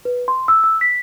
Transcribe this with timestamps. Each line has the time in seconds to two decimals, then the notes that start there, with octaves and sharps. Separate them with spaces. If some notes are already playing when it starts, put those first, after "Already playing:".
0.05 B4
0.28 C6
0.48 E6
0.64 E6
0.81 B6